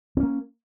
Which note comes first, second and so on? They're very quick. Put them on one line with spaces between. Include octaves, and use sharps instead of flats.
C4 C#4 A#3